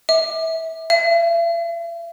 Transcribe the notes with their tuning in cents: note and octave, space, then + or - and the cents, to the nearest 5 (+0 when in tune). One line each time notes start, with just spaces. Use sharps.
E5 -25
E5 +45